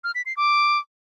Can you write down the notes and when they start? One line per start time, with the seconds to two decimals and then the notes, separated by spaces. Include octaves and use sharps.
0.04 F6
0.15 B6
0.26 C7
0.37 D6